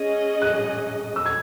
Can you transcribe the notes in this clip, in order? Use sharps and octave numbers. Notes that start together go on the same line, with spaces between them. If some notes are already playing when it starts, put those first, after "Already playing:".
Already playing: C#4 G#4 D#5
F#6
E6
G#6